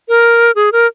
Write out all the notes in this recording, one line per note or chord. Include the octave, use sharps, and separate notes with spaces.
A#4
G#4
A#4